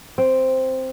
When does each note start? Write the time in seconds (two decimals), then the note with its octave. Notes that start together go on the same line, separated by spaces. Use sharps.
0.18 C4